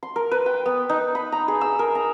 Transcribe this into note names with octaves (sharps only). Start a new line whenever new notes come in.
C6
A#4
B4
G5
B3
D#4
B5
A#5
G#4
E6
A#4
A#5